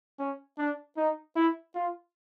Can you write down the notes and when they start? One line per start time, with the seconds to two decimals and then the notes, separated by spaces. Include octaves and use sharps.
0.19 C#4
0.58 D4
0.97 D#4
1.36 E4
1.75 F4